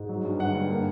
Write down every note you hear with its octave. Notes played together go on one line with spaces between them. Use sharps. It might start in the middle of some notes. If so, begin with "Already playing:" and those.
Already playing: G#2
F#3
G2
D3 F#5
G2
A#3